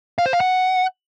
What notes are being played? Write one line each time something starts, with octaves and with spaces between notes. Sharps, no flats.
F5
C5
F5
F#5